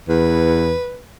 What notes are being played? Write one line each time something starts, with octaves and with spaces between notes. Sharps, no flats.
E2 B4